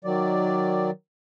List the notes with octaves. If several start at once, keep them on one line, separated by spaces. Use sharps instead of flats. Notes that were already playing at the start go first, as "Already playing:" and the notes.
D#3 F#3 D5